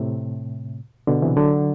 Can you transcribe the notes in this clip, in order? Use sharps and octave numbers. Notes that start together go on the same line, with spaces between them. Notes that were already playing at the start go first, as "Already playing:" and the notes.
Already playing: A2 C3
B2 D3
C3 E3
D3 F#3